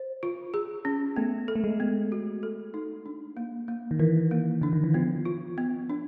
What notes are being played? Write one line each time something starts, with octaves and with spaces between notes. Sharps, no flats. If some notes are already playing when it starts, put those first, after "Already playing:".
Already playing: C5
F4
G#4
C#4
A3 B3
A4
A3
G#3
B3
F#4
A4
D#4
D4
A#3
A#3
D#3
E3 A#4
A#3
D3 D4
D#3
E3
F3 B3
F4
B3
D4